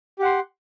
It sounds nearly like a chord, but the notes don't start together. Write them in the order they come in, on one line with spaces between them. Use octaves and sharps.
G4 F#5 C6